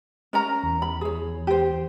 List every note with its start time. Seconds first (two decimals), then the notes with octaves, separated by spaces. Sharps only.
0.33 C#4 A#4 A#5
0.63 E2
0.82 B5
1.01 G#4 C#5
1.47 G4 C5